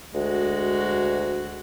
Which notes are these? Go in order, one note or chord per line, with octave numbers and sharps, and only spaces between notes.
D2 G#3 F#4